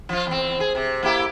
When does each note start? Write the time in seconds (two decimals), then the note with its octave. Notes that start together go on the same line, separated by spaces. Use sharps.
0.09 F3 F4
0.27 E2 C4
0.60 G#4
0.75 C3
1.03 A#3 E4 G4